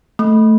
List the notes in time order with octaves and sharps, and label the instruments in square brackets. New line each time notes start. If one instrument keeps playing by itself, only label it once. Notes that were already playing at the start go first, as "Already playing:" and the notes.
[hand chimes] A3